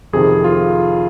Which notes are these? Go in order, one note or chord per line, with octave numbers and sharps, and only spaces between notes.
F2 C3 D#3 G#4
F4